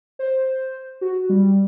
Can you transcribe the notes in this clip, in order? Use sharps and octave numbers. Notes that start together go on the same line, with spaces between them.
C5
F#4
G3